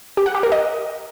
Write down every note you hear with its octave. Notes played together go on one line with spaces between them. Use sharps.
G4
F#5
G4
A#4
D#5